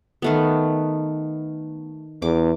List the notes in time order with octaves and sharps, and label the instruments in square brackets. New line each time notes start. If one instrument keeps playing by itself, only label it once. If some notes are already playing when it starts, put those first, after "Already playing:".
[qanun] D#3 A3 B3
[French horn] E2 [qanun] D6